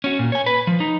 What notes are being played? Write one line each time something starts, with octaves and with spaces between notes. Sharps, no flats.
C#4 F#4
A#2
C#5 G#5
B4
F3
D#4